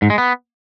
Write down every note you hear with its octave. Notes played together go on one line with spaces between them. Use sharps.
G#2
G#3
B3